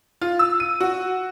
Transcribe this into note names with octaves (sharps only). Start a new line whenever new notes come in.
F4
E6
D#7
F#4